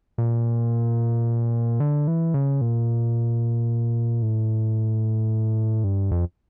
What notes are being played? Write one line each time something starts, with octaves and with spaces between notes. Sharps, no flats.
A#2
D3
E3
C#3
A#2
A2
G2
F2